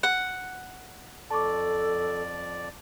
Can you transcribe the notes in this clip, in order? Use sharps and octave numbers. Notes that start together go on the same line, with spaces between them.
F#5
F2 A4 D5 A5 C#6 D6